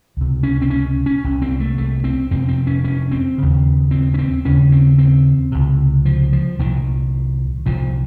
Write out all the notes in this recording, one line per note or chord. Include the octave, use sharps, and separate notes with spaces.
C#2 C3
C#4
C4
C#4
C#4
C2 C3
C4
A3
A3
C4
F2 C3 C4
C4
C#4
C#4
C4
D#2 C#3
C4
C#4
C4
D#2 C#3 C#4
C4
C4
C#2 C3
F3
F3
C2 A#2 D#3
C2 A#2 F3